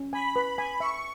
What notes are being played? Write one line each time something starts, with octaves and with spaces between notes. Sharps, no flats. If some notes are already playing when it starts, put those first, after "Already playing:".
Already playing: C#4
G#5 B5
B4
G#5
E5 C#6